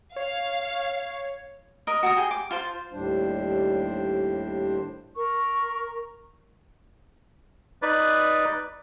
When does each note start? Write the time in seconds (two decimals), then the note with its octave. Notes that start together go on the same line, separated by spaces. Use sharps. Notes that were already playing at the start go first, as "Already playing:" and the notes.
0.16 C#5 F5
1.87 A#4 D#5
2.03 F#4 A5 D#6
2.16 G#4 G5
2.31 D6
2.51 F4 C5 A5
2.93 D#2 A2 G3 D4 C5
5.16 A#4 C#6
7.82 D#4 B4 D5